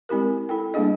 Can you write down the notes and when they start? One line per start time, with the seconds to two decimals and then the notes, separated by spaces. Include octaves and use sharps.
0.09 G#3 C4 E4 G4 A#4
0.49 E4 A4 G5
0.74 G3 A#3 D4 G#4 D#5